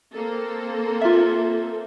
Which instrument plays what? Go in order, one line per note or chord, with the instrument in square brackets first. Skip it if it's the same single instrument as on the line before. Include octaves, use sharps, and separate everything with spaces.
[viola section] A#3 C4 A4
[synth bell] F4 E5